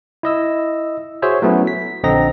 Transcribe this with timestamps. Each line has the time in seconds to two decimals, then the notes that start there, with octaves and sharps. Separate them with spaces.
0.23 E4 D#5 E6
1.22 F#4 G#4 C5 C#5 E5
1.42 F#3 A3 B3 C#4 E4
1.67 B6
2.03 A#1 D3 C4 D#5 A#5 A#6